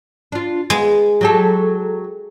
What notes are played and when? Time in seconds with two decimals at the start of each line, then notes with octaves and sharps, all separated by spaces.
0.32 D4 F4
0.70 G#3 B3
1.21 F#3 G4 A4